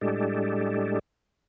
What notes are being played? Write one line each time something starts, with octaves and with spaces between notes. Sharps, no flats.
A2 G3 G#3 D4 G4 A4